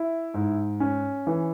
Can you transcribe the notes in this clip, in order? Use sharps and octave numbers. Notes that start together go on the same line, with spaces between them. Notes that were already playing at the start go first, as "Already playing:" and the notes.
Already playing: E4
G#2
C#4
E3